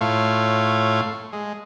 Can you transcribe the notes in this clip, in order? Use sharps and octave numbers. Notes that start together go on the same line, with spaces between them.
A2 A3 F4 C#5 F5
G#3